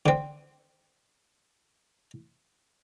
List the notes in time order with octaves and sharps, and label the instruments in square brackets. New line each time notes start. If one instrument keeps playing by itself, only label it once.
[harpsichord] D3 C4